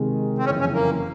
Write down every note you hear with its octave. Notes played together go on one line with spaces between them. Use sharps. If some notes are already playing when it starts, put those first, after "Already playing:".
Already playing: C3 D#3 G#3
C4
F#1 F2 C#3 E3 C#4
C#4
A#3